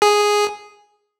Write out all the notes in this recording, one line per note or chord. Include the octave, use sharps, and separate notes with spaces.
G#4